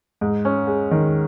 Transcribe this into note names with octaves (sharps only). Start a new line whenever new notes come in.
G#2
C#4
G#3
D#3